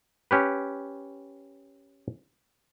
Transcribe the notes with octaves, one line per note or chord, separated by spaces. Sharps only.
C#4 G4 B4